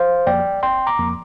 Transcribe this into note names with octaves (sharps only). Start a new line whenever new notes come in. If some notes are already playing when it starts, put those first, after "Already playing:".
Already playing: C5 F5
F2 F3 A#3 D5 G5
G1 G5 C6
A#5 D6
F2 F3 A#3